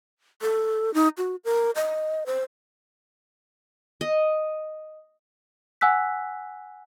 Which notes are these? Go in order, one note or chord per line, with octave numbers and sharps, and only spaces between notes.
A4
D#4
F#4
A#4
D#5
C5
D#5
F#5 G#5 E6 F#6 B6